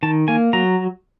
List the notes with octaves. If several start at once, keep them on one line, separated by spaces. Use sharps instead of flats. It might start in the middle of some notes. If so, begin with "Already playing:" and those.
D#3 A5
A#3 G#5
F#3 A#5